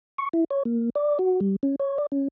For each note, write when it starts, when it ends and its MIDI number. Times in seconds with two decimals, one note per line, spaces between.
0.18 0.29 85
0.33 0.44 64
0.51 0.63 73
0.65 0.90 58
0.95 1.18 74
1.19 1.40 66
1.41 1.56 55
1.63 1.76 61
1.80 1.98 73
1.98 2.06 74
2.12 2.28 61